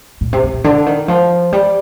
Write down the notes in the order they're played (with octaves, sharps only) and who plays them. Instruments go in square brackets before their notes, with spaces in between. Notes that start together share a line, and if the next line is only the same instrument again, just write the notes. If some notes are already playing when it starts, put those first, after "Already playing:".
[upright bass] A#2
C3
C3
A#2
D3
D#3
F3
G3